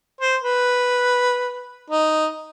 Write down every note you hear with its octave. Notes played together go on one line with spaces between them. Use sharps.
C5
B4
D#4